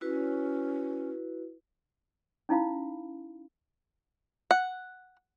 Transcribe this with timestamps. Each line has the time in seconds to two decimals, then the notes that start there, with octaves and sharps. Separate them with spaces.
0.01 C#4 E4 F#4 B4
2.49 C#4 D#4 E4 F5 B5
4.51 F#5